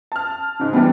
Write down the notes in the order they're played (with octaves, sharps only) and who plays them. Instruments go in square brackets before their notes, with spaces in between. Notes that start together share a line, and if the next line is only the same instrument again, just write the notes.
[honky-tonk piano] A5 F6
G#2 C#3
[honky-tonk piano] G2 E3 G3 [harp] B3